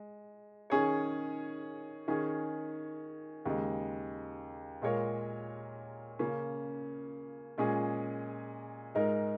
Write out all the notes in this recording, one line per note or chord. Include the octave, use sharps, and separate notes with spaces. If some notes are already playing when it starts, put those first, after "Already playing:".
Already playing: G#3
D#3 C#4 G#4 C#5
D#3 C#4 G#4
D#2 C#3 G#3
A#2 G#3 F4 A#4 C#5
C#3 A#3 C#4
A#2 G#3 C#4 G#4
G#2 G#3 D#4 A#4